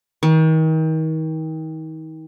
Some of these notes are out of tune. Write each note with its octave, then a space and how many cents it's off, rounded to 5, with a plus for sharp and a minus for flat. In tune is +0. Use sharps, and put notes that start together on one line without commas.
D#3 +35